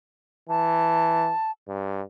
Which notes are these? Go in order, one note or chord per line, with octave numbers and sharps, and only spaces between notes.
E3 A5
G2